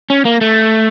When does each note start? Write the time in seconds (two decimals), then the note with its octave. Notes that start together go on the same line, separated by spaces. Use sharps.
0.10 C#4
0.25 A#3
0.41 A3